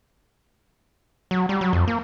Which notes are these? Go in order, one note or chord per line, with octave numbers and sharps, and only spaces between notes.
F#3
G3
F#3
F2
A#3